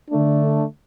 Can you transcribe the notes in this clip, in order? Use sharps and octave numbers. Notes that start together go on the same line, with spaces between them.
D3 A3 D4